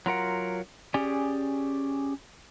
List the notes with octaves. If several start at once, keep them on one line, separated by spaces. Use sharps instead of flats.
F#3 F4 A#4 F#5
C#4 G4 G#4 D5